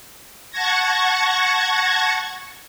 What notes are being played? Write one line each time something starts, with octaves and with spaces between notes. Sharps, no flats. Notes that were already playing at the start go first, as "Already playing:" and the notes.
F#5 A5 C#6 G#6 A#6